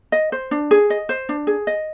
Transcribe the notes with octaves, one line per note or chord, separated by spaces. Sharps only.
D#5
C5
D4
G#4
D#5
C5
D4
G#4
D#5